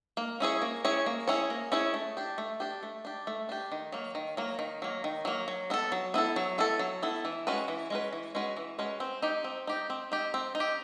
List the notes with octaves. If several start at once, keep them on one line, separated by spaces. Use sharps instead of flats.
A#3
C#4 E4 G#4 C#5
A#3
C#4 E4 G#4 C#5
A#3
C#4 E4 G#4 C#5
A#3
C#4 E4 G#4 C#5
A3
D4 G4
A3
D4 G4
A3
D4 G4
A3
D4 G4
D#3
F#3 A#3
D#3
F#3 A#3
D#3
F#3 A#3
D#3
F#3 A#3
F#3
B3 E4 A4
F#3
B3 E4 A4
F#3
B3 E4 A4
F#3
B3 E4 A4
E3
G#3 C#4 F#4 B4
E3
G#3 C#4 F#4 B4
E3
G#3 C#4 F#4 B4
E3
G#3 C#4 F#4 B4
C4
D#4 G4
C4
D#4 G4
C4
D#4 G4
C4
D#4
G4